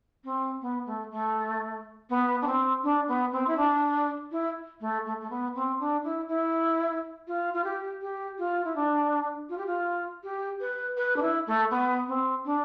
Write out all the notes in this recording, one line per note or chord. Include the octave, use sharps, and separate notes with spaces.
C4
B3
A3
A3
B3
D4
C4
D4
B3
C4
E4
D4
E4
A3
A3
A3
B3
C4
D4
E4
E4
F4
F4
G4
G4
F4
E4
D4
F4
G4
F4
G4
B4
B4
D4
E4
A3
B3
C4
D4